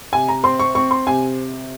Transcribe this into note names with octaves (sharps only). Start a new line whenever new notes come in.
C3 G#5
A#5
C4 C6
C#6
C4 C#6
C6
C3 G#5